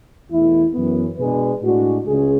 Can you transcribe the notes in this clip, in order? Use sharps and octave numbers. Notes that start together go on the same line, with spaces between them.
E2 B2 A3 E4
F#2 E3 B3
B2 G#3 D4 G#4 B4
A2 G#3 D4 F#4
C#2 C#3 G#3 C#4 G#4